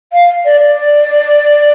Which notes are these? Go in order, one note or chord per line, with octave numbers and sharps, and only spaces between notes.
F5
D5
D5